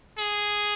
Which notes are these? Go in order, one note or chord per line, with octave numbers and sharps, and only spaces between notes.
G#4